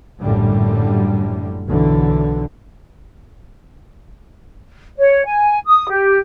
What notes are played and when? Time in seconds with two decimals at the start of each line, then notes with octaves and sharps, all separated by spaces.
0.22 A#1 F#2 A2 D3 G3
1.67 B1 D3 E3
4.98 C#5
5.25 G#5
5.65 D#6
5.89 G4